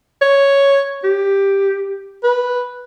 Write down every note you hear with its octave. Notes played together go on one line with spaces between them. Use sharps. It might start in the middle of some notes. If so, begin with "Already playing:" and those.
C#5
G4
B4